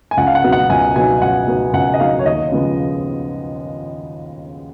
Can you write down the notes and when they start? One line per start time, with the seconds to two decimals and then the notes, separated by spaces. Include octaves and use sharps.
0.11 G#5
0.17 C#2 F#5
0.27 F5
0.35 F#5
0.44 B2 F#3 B3 D#4
0.52 F#5
0.69 C#2 G#5
0.96 B2 F#3 B3 D#4 G#5
1.22 C#2 F#5
1.48 B2 F#3 B3 D#4
1.73 C#2 F#5
1.94 D#5
2.00 B2 F#3 B3 D#4 F5
2.19 C#5
2.25 D#2 D#5
2.52 C#3 F3 G#3 B3